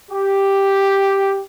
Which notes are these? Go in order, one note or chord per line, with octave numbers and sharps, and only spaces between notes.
G4